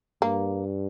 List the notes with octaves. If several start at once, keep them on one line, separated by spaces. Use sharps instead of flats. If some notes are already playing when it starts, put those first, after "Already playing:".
G2 A#3